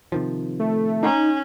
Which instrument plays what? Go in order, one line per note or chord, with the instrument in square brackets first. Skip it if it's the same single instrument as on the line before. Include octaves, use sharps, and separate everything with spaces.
[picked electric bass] C3 D#3 F3
[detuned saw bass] A3
[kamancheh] C#4 [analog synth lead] D#4